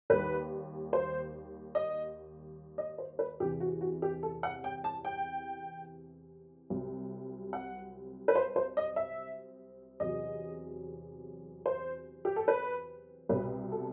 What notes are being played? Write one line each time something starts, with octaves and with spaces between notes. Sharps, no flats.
D#2 D#3 G3 B4
C5
D#5
D#5
C5
B4
E2 C3 E3 G4
F#4
F#4
G4
A4
F#5
G5
A5
G5
C2 C3 F#3 C4
F#5
B4
C5
C5
D#5
E5
E2 C3 F#3 D#5
C5
G4
A4
B4
C2 B2 G3 B4
A4